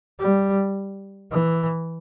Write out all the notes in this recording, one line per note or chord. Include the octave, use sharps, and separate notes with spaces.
G3
E3